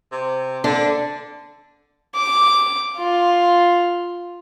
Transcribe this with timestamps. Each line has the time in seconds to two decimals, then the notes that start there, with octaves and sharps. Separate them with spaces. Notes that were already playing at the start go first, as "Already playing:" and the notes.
0.12 C3
0.64 D3 D4
2.15 D6
2.97 F4